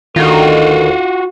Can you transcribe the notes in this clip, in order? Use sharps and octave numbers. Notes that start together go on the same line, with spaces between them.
D2 D#3 F4 F#4 A4